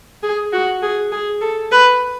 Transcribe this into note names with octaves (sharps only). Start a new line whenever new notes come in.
G#4
F#4
G#4
G#4
A4
B4